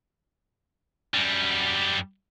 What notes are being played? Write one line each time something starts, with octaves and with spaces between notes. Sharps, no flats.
F#2 G3